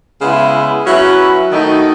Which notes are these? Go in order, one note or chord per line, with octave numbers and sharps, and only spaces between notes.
C#3 G#3 B3 E4
F#3 C#4 E4 B4
D#3 A3 D#4 F#4